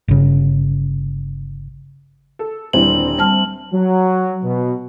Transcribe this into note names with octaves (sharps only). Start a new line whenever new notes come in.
G1 C#3
A4
D#1 D3 E3 G3 C4 F#7
G3 A5 F6
F#3
B2